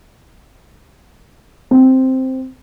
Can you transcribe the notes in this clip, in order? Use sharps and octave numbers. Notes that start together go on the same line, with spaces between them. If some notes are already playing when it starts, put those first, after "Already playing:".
C4